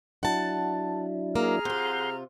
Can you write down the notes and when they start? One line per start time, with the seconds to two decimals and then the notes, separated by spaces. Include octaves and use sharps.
0.23 F#3 D4 E4 F#5 A5
1.36 A#3 G#4 A#5 F6
1.65 C3 F4 F#5 C6 G6